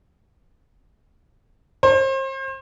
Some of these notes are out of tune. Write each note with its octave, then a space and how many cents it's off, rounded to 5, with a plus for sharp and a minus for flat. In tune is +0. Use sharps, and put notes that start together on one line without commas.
C5 +35